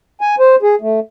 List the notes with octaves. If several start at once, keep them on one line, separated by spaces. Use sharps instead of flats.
G#5
C5
G#4
A3